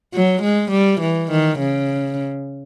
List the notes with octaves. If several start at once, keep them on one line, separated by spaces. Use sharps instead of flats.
F#3
G#3
G3
E3
D#3
C#3